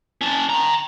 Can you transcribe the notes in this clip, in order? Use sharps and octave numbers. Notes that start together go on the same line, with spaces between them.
C#4 A5
G5 A#5